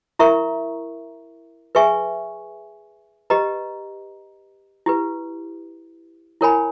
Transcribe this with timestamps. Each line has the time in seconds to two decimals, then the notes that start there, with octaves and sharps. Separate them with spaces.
0.19 E4 A#4 E5 A#5 C#6
1.75 G#4 B4 E5 G#5 C#6
3.30 G4 B4 D#5 A#5
4.86 E4 G4 B4
6.41 E4 A#4 C#5 G#5 B5